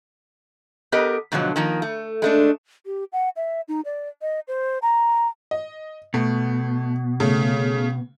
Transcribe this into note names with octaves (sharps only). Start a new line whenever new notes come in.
B3 G4 A4 A#4 D#5
G#2 B2 D3 F3 F#3
D#3 F3 A#3
A3
G#3 A3 D4
G4
F#5
E5
D#4
D5
D#5
C5
A#5
D#5
B2 A3
C#3 A3